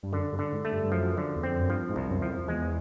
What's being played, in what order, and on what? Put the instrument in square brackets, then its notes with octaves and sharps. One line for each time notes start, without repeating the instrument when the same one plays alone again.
[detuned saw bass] G2
[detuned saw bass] F#2 [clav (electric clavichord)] D3
[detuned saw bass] G2
[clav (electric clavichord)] D3
[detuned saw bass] G#2
[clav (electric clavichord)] A3
[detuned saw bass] G2
G2
[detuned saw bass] F#2 [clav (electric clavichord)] F3
[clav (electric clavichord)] D3
[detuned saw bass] E2
[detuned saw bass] F2 [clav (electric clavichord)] C4
[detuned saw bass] F#2
[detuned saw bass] G2 [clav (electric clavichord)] F3
[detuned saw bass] G#2
[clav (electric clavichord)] C2
[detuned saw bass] F#2
[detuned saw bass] E2 [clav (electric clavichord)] F3
[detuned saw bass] F2
[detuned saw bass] E2 [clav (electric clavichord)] G#3